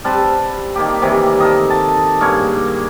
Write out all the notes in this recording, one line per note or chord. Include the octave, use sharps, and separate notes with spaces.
G3 C4 B4 A5
D#3 A#3 G4
C3 D#3 E3 G3
A4 A#4 D#5
A5
G2 A#3 G#4 C#5